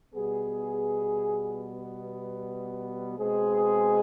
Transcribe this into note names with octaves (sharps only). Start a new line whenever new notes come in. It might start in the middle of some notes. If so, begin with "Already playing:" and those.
B2 G3 B3 G#4
B2 G#3 C4 G#4